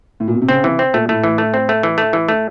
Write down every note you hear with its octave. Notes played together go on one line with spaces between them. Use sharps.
A2
A#2
B2
C3
C#3 C4
C3 E3
C4
A#2 A3
A2 A3
E3
A3
C4
A3
E3
A3
E3
A3